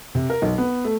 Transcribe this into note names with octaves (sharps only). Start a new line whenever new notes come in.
C3
A#4
B1
B3
A3